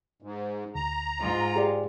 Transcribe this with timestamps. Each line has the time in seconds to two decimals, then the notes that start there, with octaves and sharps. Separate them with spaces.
0.22 G#2
0.75 D2 A#5
1.18 G#2 F4
1.56 G4 G#4 D5